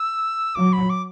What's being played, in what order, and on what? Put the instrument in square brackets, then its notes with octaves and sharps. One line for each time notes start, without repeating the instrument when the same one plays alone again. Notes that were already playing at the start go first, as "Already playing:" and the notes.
Already playing: [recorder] E6
[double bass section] F#3 [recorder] D6
[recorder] B5
D6